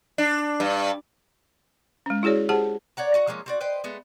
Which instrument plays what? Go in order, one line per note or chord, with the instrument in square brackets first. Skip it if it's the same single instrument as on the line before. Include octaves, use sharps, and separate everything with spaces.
[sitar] D4
G2
[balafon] G#3 C#4
E4 F#4 G#4 C#5 D5
G4 G#4 C5 F#5 A5
[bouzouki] C#5 D5 F#5 A#5
D#4 F#4 F#5
F3 G#3 A#3 C#4
C4 F#4 D5
B4 C5 D#5 G5
G#3 A3 B3